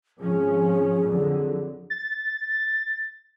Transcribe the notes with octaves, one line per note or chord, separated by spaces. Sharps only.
G#1 F3 C#4 G#4
F2 D3 F#3
A6